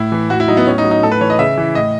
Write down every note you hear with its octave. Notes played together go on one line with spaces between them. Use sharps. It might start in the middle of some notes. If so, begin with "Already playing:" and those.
Already playing: A2 E4
E3
A2 F#4
E4
F#3 D#4
B3
A2 C#4
D#4
F#3
D#4
A2 A4
B4
E3 C#5
D#5
C#3 E5
E3
A2 D#5